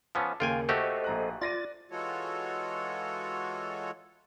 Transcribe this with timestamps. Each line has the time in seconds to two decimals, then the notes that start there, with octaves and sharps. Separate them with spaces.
0.15 F3 B3 C#4 A5 D6 E6
0.40 D#2 C#3 A#3 F4 G5 G#5
0.69 A3 F#4 G4 A4 C5 D#5 E6
1.04 A#1 A#5 F#6
1.42 F4 D5 A6 A#6 D#7
1.91 E3 G#3 F4 F#4 A4 C#5